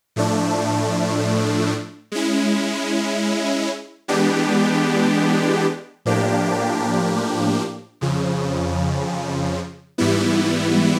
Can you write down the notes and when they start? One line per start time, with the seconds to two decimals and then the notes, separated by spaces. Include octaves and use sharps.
0.16 A2 F3 A3 D4
2.12 G#3 C#4 E4
4.08 E3 G#3 B3 D4 G4
6.05 A2 F3 A#3 D4 G4
8.01 F2 C#3 F3
9.98 G#2 E3 G3 B3 E4